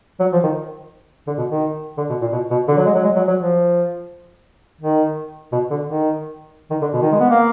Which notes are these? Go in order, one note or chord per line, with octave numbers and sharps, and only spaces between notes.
F#3
F3
D#3
D3
B2
D#3
D3
B2
A#2
B2
B2
D3
F#3
G#3
F#3
G#3
F#3
F#3
F3
D#3
B2
D3
D#3
D#3
D3
B2
D#3
G#3
B3
A#3